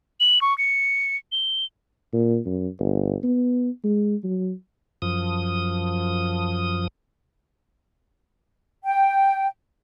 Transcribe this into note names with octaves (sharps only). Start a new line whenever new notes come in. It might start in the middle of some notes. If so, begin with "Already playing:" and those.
F#7
C#6
C#7
G7
A#2
F#2
G1
B3
G#3
F#3
F#2 F3 D#6
G5